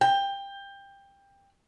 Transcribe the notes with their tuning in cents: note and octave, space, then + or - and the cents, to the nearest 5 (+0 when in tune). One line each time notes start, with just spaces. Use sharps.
G5 +20